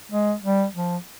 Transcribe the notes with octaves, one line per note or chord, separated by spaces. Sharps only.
G#3
G3
F3